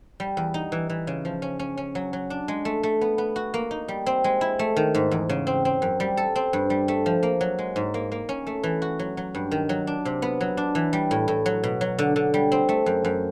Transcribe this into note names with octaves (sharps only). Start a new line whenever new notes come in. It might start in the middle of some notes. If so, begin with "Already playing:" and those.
G3
E2
D#4
E3
E3
C#3
F3
C#4
C#4
C#4
F#3
F#3
D4
G#3
A3
A3
B3
B3
F#4
A#3
D#4
G3
C4
G#3
E4
A3
D#3
G#2
E2
C#3
C4
C4
F#2
G3
A4
C4
G2
G3
A3
F3
A#3
F#3
G#3
G#2
A#3
A#3
C#4
A3
E3
F#4
F#3
F#3
G2
D#3
F#3
D4
C3
B3
F#3
D4
E3
G3
A2
A2
F#3
B2
F#3
D3
D3
G3
C4
A3
F#2
F#2